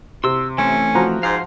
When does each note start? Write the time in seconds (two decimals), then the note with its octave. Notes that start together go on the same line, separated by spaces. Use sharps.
0.24 C3 C6 E6
0.58 E3 A3 C4 C#4
0.95 F3 F#4 A#5
1.23 G#2 C5 F5